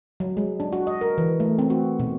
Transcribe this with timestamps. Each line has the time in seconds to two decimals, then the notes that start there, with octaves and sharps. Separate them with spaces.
0.20 F#3
0.37 G#3
0.60 D4
0.73 F#4
0.87 D#5
1.01 A#4
1.18 E3
1.40 A3
1.59 C4
1.70 F#4
2.00 B2